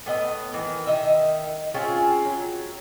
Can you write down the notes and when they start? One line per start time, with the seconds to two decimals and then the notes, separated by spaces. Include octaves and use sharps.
0.06 A2 B3 D#5
0.54 D#3 E3
0.87 D#3 D#4 D#5 E5
1.74 C4 C#4 F4 G#4
2.25 F#3